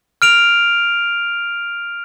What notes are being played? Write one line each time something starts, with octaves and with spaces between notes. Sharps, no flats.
F6 D7 F7